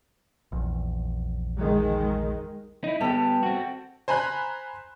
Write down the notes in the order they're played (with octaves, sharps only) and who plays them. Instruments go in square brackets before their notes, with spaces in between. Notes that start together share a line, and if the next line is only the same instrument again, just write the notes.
[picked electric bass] A#1 E2
[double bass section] D#3 G#3
[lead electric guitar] D#4 E4
[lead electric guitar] G3 B3 [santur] A4 G5
[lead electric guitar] C4 F#4
[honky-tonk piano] C5 G#5 A#5 B5 F#6